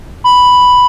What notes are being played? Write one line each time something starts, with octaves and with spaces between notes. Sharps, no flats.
B5